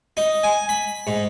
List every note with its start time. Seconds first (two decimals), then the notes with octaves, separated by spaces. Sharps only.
0.17 D#4
0.43 G#5
0.69 B5
1.07 G#2